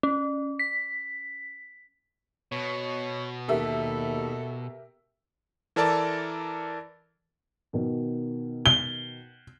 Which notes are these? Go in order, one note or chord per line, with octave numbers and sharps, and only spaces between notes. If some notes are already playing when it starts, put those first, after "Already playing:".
C#4
B6
B2 C#5
D#2 G4 A4 A#4 E5
E3 A4 A#4 D5 A5
B2 D#3
G7